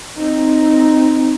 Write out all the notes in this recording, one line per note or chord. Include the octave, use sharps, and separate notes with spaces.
C4 D#4